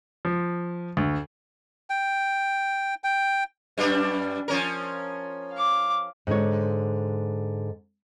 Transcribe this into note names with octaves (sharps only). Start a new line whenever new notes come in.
F3
D2
G5
G5
F#2 G3 D4
F3 C#4 A#4
F5 D6
G#2 D3 D4 C#5